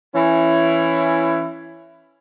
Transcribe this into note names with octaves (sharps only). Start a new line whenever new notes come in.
E3 C#4 E4